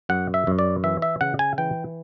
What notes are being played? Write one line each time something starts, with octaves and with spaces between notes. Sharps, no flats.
F#2 F#5
E5
F#2
D5
E3 E5
E5
C#3 F#5
G#5
E3 G5